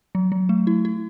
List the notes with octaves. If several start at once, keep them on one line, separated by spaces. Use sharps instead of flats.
F#3
F#3
A3
E4
E4